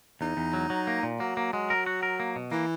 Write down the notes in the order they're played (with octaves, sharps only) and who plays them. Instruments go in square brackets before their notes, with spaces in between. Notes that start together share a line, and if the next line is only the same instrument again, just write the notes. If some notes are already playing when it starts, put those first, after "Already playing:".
[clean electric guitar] E2 [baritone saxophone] D#4
[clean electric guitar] E2
F#3
F#3
A#3
A#2
[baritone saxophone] F#3 [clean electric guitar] A#3
[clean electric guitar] A#3
[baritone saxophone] F#3 [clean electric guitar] G#3
[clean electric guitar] A#4
F#4
A#4
A#3
B2
[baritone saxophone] E3 [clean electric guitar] A#3